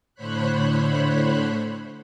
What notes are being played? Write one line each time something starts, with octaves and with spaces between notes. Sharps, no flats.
A2 D3 C5 C#5 B5 F#6